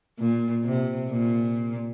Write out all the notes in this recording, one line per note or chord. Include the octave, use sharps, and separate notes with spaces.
A#2
C3
A#2